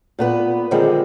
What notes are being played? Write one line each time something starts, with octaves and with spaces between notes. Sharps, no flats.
A#2 B3 B4
D3 D#3 F3 G3 G#3 C4